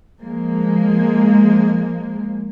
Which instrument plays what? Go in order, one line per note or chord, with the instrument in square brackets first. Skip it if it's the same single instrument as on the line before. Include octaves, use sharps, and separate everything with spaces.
[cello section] F3 G#3 A#3